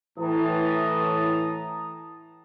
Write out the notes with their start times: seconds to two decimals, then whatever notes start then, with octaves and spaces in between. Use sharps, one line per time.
0.19 A2 E3 A5 A#5 D#6